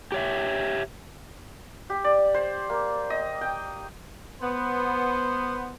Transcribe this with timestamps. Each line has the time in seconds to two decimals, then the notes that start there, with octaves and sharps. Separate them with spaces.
0.12 G4 C#5 E5
1.90 G4
2.04 D5
2.34 C5
2.70 A#3
3.10 D#5
3.41 G5
4.41 B3 C5